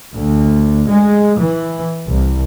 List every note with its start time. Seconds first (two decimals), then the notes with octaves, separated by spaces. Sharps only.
0.14 D2
0.89 G#3
1.39 E3
2.07 C2